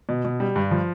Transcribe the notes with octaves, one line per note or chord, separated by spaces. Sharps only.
B2
B2
G3
G2
F3